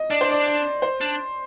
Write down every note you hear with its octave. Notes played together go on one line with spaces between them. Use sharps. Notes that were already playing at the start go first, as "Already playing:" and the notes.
Already playing: D#5
D4 D5
C5
D5
D5
C5
D4